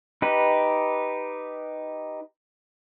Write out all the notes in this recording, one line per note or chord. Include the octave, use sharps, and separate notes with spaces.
D#4 G4 B4